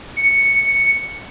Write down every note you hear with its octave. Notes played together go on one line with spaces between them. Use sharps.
C#7